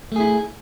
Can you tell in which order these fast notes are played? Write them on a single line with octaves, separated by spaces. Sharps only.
A3 G#4 E4